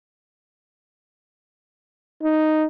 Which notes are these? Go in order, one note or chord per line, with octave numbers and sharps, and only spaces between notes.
D#4